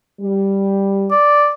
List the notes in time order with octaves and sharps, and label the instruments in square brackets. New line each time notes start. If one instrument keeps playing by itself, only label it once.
[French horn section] G3
[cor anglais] D5